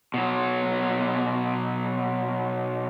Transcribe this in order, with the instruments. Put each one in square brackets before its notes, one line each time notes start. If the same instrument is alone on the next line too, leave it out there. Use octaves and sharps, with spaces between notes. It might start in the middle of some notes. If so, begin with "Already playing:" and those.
[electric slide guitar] B2 F#3